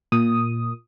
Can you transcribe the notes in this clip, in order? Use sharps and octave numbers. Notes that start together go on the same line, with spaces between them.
A#2 D#6